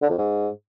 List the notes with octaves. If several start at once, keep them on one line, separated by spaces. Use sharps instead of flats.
D3
F2
G#2